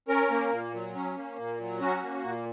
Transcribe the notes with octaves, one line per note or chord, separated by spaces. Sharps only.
C#4 A#4
A#3
A#2
F#3
C#4
A#3
A#2
F#3
C#4 F#4
A#3
A#2